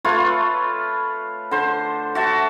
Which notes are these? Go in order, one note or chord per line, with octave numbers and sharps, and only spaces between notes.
A3 F4 B4 C#5
D3 C5
F#4 E5 A5